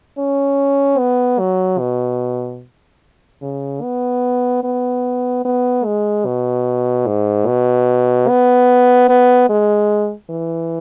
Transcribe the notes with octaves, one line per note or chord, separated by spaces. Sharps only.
C#4
B3
F#3
B2
C#3
B3
B3
B3
G#3
B2
G#2
B2
B3
B3
G#3
E3